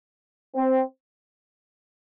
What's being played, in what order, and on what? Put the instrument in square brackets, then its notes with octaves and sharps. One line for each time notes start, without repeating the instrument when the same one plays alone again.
[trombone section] C4